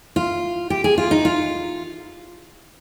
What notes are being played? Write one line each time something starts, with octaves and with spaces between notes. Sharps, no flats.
F4
G4
G#4
F4
D#4
F4